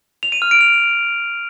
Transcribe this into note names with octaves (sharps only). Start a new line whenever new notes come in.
F7
D#7
F6
D7
F7